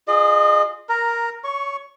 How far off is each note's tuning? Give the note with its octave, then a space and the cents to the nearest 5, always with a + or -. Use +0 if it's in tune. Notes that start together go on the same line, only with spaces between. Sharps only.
F4 +0 G#4 +0 D#5 -35
A#4 +5 A#5 -5
C#5 +25 C#6 +0